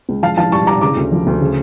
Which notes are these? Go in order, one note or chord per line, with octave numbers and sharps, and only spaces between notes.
C#2
F3 F5 A5
F3 F5 A5
G2 A5 C#6
G2 A#5 D6
C#3 A#5 D6
D2
F3
D2
C#3